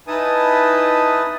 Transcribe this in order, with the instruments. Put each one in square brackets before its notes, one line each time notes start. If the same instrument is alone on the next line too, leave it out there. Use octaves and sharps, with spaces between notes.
[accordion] D#4 E4 B4 G#5 A5 D#6